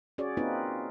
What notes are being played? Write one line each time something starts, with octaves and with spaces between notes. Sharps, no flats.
C#4 F#4 G#4 C#5 D5
A#3 C4 D#4 F4 B4